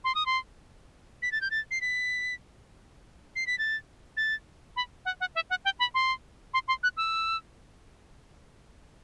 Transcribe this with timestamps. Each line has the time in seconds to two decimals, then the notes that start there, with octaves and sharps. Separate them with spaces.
0.04 C6
0.15 D#6
0.26 C6
1.22 B6
1.32 A6
1.41 G6
1.51 A6
1.71 C7
1.81 B6
3.36 C7
3.47 B6
3.59 A6
4.17 A6
4.76 B5
5.05 F#5
5.20 F#5
5.35 E5
5.50 F#5
5.65 G5
5.79 B5
5.94 C6
6.54 C6
6.68 C6
6.83 F#6
6.97 E6